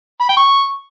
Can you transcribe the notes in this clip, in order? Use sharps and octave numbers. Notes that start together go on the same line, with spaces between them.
B5
G5
C#6